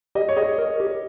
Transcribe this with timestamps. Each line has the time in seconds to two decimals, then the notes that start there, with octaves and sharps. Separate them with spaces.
0.15 G4 D#5
0.29 C#5
0.37 G#4 D#5
0.58 A#4
0.80 G4